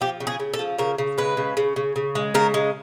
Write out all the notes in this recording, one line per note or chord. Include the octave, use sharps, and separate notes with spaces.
F3 G4
C#3
G#4
C#3
A4
F3
C#3 A#4
C#3
G#3 B4
C#3
C#3
C#3
C#3
G#3
C#3 A#4
G#3